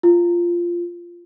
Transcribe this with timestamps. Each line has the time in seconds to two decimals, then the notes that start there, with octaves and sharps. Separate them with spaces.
0.03 F4